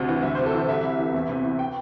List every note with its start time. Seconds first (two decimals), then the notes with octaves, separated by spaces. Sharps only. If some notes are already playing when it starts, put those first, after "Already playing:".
Already playing: D2 C3
0.09 E3
0.23 D2 E5
0.35 C5
0.39 C3
0.46 A4
0.54 E3 C5
0.68 C2 E5
0.84 C3
0.99 E3
1.14 E2
1.29 C3
1.44 E3
1.59 G5